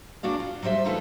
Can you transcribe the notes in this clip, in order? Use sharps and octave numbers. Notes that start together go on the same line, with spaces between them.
E2 D4 F#4 D5 F5
F4
F#3 G3 C5 C#5 E5
E3 A3 D#4 F4 A4 B4